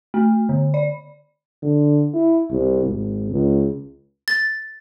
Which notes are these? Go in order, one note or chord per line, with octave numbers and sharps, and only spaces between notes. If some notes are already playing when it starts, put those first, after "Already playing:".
A3
D3
D5
D3
E4
C2
G#1
C#2
A6